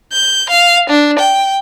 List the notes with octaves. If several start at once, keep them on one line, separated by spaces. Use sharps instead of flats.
G6
F5
D4
G5